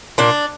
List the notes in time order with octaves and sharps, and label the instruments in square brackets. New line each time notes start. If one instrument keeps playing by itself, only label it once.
[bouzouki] A#2 D4